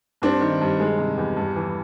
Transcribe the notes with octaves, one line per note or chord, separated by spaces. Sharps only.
G2 C4 D4
D#3
G2
G#3
C3
E2
G2
E3